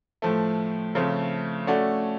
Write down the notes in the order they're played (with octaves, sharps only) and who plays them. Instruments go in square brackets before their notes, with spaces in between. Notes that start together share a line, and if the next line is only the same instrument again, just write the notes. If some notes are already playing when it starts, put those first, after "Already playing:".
[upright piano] A2 F3 A3
C#3 F3 A3 C4
A3 C#4 F#4 A4 D5